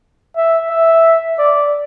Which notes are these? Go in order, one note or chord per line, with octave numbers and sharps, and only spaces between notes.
E5
E5
D5